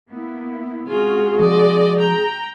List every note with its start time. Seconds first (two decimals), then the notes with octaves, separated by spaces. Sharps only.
0.11 A#3 B3 E4
0.87 C3 G#3 C#4 F4 F#4 G#4
1.39 F3 D5 D#5
1.98 G5 A#5